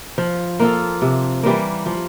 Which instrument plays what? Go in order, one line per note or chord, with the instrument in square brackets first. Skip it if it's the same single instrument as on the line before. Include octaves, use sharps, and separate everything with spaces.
[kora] F3
A#3 F4 A4
C3
E3 G3 A#3
F3